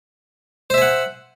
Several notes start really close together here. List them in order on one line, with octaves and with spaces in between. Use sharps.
C5 E5 G#5 F#5